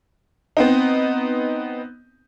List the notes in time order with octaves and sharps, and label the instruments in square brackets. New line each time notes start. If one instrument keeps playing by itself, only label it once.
[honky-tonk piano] B3 C4 D#4